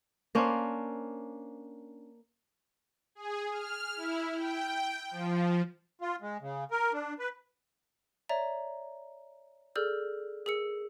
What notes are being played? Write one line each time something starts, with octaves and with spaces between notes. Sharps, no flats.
A#3 C#4 D4 C5
G#4
F6
E4
G5
F3
F4
G#3
C#3
A#4
D4
B4
C#5 D5 E5 A#5
G#4 A4 D5 E6 F6 G6
G#4 A#4 E6 C#7